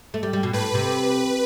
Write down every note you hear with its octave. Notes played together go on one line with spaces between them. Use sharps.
A3
G3
G3
B2
A2 B4
C3